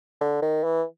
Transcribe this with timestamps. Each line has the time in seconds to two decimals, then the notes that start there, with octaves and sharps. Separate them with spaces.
0.21 D3
0.42 D#3
0.64 E3